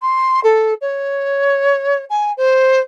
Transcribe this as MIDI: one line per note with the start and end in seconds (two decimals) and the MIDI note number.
0.01 0.40 84
0.43 0.73 69
0.81 2.04 73
2.09 2.32 80
2.37 2.79 72